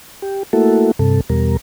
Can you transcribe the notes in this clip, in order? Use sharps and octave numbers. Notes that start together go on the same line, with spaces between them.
G4
A3 A#3 E4 F#4 A4
G2 C3 A4
E2 B2 G3 A#4